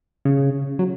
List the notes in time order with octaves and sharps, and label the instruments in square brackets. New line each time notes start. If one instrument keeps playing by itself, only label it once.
[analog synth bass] C#3
F#3